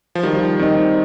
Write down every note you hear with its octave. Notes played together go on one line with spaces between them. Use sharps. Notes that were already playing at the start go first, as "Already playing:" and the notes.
F3
D#3 G3
D#3 C4 D#4